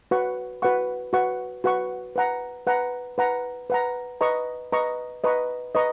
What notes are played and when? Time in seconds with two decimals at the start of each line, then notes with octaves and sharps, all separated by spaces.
0.11 F#4 B4 F#5 C#6
0.62 F#4 B4 F#5 C#6
1.13 F#4 B4 F#5 C#6
1.64 F#4 B4 F#5 C#6
2.16 B4 F#5 A#5
2.67 B4 F#5 A#5
3.18 B4 F#5 A#5
3.70 B4 F#5 A#5
4.21 B4 D#5 A#5 C#6
4.72 B4 D#5 A#5 C#6
5.24 B4 D#5 A#5 C#6
5.75 B4 D#5 A#5 C#6